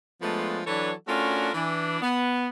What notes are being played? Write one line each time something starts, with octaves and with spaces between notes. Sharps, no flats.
F3 G#3 A3 B3 D4 F4
E3 F#3 D4 A4 B4 C#5
A3 C#4 D4 F4 F#4 A#4
E3 D4
B3